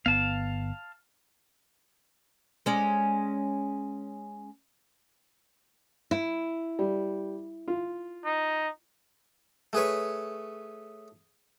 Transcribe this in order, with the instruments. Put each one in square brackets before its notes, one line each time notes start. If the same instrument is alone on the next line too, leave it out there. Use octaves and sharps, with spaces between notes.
[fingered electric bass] G1 B3 [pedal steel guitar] F5 A5
[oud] G#3 C#4 D5
[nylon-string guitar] E4
[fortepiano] G3
F4
[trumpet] D#4
[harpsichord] A3 G#4 B4 C#5